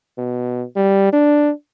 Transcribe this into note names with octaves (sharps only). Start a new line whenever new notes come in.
B2
G3
D4